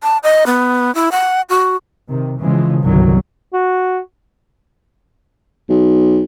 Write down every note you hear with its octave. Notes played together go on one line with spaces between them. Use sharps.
A5
D#5
B3
E4
F#5
F#4
C3 D#3
C#3 E3 F3 G#3
G1 C2 F#2 D#3 F#3
F#4
B1